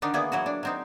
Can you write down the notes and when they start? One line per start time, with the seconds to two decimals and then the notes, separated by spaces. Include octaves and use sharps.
0.02 D3 D#3 D4 D#4
0.14 A#3 B3 D4 E4 G#4
0.32 E3 F#3 E4 F#4
0.46 D4
0.63 F#3 C4 D#4